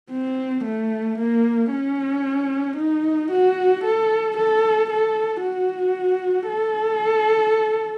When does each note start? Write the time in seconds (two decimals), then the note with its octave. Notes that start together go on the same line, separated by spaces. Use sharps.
0.11 C4
0.64 A3
1.18 A#3
1.71 C#4
2.77 D#4
3.31 F#4
3.84 A4
4.37 A4
4.90 A4
5.42 F#4
6.49 A4